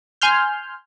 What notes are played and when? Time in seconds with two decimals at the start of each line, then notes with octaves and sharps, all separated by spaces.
0.22 G#5 C6 F6 G6